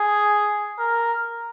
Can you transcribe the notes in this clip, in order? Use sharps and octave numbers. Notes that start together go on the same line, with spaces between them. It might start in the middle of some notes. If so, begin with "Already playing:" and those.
Already playing: G#4
A#4